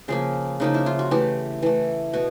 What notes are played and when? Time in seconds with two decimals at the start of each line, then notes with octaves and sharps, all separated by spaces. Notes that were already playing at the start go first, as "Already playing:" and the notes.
0.08 C#3 F3 A#3 G#4
0.60 C#3 F3 A#3 D#4
0.74 E4
0.86 F4
0.99 F#4
1.11 E3 A3 G4
1.62 E3 A3
2.13 B2 F#4